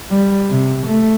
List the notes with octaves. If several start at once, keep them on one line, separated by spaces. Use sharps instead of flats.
G3
C3
A3